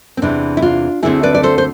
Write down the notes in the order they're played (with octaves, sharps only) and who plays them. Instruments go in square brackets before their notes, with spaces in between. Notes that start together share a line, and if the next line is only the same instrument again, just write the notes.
[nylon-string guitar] C4
E2 C3 E3 D4
E4
D4 F4
D2 D3 A3 C4 E4 G#4
B4 D5
D5
A4 C5
C5